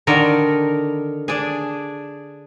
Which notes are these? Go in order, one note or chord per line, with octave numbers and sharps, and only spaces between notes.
D3 D#3 A#4
D4 G#4